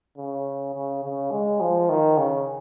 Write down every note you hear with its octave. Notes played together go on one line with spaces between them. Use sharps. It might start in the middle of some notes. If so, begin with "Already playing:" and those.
C#3
C#3
C#3
G#3
F3
D#3
C#3